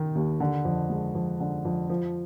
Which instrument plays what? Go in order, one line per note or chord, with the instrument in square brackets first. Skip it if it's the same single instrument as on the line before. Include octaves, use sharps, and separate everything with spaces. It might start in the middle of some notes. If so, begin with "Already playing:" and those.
Already playing: [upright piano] D#3 D#4
D#2
D3
F2
G#3
F2
D3
F2
F3